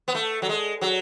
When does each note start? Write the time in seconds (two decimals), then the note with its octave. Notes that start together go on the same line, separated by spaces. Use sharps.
0.08 B3
0.15 A3
0.42 F#3
0.49 G#3
0.81 F#3